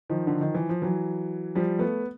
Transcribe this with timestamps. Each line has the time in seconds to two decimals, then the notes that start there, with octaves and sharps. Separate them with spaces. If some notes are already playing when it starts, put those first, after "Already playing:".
0.10 D#3 F3
0.27 D3
0.41 D#3
0.54 E3
0.69 F3
0.82 E3 F#3
1.55 F3 G3
1.79 A3 B3